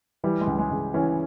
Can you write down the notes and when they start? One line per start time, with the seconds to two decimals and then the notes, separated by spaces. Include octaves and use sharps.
0.24 E3 G3
0.41 G#3
0.47 C#2
0.59 G#3
0.71 C#2
0.94 E3 C#4